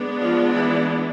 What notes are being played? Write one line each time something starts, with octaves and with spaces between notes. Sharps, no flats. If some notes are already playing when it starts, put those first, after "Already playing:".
Already playing: G#3 B3 D4
F3 F4
E3 E4